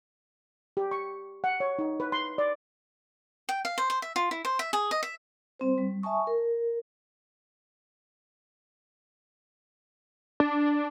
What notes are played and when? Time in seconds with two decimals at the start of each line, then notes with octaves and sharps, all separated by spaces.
0.77 G4
0.91 C#6
1.44 F#5
1.60 C#5
1.79 D#4
2.00 B4
2.12 C6
2.38 D5
3.49 G5
3.65 F5
3.78 C5
3.90 C5
4.02 E5
4.16 F4
4.31 E4
4.45 C5
4.59 E5
4.73 G#4
4.91 D#5
5.03 E5
5.60 G3 C4 C5
5.78 G3
6.02 E5 G#5 A5 C#6 D#6
6.27 A#4
10.40 D4